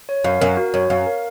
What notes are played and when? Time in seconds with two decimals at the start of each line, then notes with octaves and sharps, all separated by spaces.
0.09 C#5
0.24 F#2 F5
0.41 F#2 A#4
0.57 F#4
0.74 F#2 C#5
0.90 F#2 F5
1.06 A#4